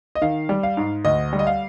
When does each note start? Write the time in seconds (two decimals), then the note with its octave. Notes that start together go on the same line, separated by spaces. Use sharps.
0.15 D#5
0.22 D#3 F5
0.49 G3
0.63 F5
0.77 G#2
1.05 D2 D#5
1.33 G3
1.39 D#5
1.47 F5